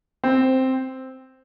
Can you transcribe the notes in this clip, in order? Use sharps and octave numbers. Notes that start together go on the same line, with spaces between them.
C4